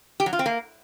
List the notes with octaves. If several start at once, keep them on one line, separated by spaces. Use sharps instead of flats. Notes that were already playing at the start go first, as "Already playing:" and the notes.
G4
F#3
F4
C4
A#3